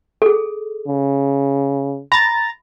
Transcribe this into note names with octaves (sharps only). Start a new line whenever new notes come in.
G#4 A4
C#3
A#5 B5 A6